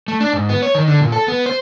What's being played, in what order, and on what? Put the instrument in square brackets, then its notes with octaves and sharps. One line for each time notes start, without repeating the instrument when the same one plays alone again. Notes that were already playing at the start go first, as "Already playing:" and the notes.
[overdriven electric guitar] A3
D4
G#2
B3
C#5
D#3
D3
A#2
A4
B3
C5